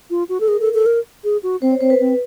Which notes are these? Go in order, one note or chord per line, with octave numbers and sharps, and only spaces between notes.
F4
F#4
A4
G#4 A#4
A4
A4
A#4
G#4
F#4
C4 C5
C#5
C4 C5
B4
C4